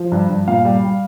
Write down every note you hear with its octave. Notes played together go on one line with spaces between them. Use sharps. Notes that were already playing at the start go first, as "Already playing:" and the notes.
Already playing: F3
G2
G2
A#2 F5
G3
G3